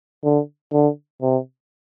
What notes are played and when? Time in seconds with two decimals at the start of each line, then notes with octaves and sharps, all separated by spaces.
0.24 D3
0.73 D3
1.22 C3